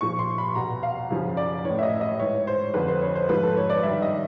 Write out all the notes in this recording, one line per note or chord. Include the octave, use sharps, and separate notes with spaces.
A#2 F3 C#6
C6
B5
E2 B2 A#5
F5
F#2 C#3 F3
D5
A2 E3 C#5
E5
D#5
D#5
G#2 E3 C#5
C5
F2 D3 F3 B4
C5
C#5
C5
G#2 F3 B4
A4
C#5
D5
G2 D#3 E5
D#5